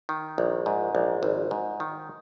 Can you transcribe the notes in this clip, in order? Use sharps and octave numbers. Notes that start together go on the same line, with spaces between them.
D#3
A#1
G#2
A#1
G#1
G#2
D#3